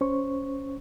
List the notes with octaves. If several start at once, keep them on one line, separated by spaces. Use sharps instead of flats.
C#4 C5 C#6